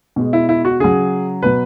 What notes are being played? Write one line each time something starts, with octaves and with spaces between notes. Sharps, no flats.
B2 G#3
E4
E4
F#4
C#3 F#3 G#4
B2 F#3 B4